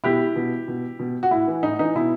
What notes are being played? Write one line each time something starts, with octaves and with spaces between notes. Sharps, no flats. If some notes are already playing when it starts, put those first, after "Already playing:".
B2 E4 G4
B2
B2
B2
F#4
A2 E4
E3
A2 D#4
E3 D#4
B2 E4